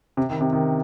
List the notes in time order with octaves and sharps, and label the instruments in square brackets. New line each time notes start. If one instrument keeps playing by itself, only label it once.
[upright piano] C3
D#3
C3
D#3